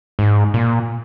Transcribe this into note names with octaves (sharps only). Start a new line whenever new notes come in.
G#2
A#2